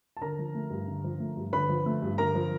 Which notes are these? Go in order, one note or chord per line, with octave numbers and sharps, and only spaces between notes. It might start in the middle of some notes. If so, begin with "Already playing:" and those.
A5
D3 A#4 A#5
F3
A3
G2
D3
F3
A3
G2
D3 B4 B5
F3
A3
G2
D3 A#4 A#5
F3